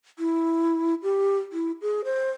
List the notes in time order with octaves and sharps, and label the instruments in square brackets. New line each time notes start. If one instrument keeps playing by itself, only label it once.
[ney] E4
G4
E4
G#4
C5